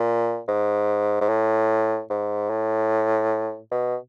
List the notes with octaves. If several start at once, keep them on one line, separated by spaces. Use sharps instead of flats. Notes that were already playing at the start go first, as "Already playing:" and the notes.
Already playing: A#2
G#2
G#2
A2
G#2
A2
B2